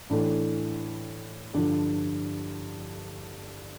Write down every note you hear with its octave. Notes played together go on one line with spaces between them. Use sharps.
A2 E3 A3 D4
G2 D3 F3 D4